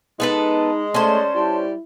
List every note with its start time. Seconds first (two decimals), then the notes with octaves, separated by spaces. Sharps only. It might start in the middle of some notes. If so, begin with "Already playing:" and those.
0.20 G#3 B3 D#4 A4 B4
0.94 A3 C#4 C5 D5 A5 C6
1.35 G3 E4